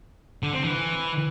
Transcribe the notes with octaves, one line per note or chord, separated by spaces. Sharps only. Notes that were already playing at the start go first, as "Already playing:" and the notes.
D3
C4
E3